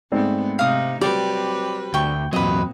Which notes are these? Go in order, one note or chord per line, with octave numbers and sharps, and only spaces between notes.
G#2 A3 B3 C4 D5
C3 D#4 F5 D#6
F#3 G3 C4 G4 B4 D5
D2 G5 C#6
E2 A#2 F#3 C4 B4 D#5 D#6